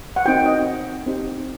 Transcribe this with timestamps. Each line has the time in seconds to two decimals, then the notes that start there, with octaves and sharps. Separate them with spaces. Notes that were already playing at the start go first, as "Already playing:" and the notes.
0.16 F#5
0.25 C4 D#4 F#4 G5
0.46 D#5
1.06 C4 D#4 G4